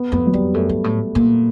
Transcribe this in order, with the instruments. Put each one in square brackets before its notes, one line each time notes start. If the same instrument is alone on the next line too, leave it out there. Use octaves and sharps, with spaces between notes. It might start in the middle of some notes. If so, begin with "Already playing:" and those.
Already playing: [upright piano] B3
[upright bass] F2 [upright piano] B3
[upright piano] F#3
[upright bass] F2 [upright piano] G3
[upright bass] F#2 [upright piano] A3
[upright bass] G2
A2
A#2